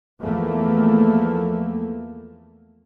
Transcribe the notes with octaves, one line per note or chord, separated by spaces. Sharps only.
E2 F3 A3 A#3